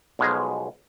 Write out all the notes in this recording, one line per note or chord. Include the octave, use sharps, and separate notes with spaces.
B1 B2 F3 G#3 G#4 A#5